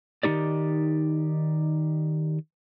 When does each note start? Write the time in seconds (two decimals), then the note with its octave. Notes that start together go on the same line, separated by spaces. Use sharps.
0.23 D#3 G3 D#4 G4 D5